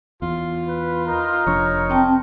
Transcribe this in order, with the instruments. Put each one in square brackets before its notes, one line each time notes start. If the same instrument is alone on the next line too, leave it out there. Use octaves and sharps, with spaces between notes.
[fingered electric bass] E2 [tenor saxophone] F4
[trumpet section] B4
D#4 A#4
[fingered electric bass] F1 F3 D4 [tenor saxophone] C#5
[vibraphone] C4 G5 A5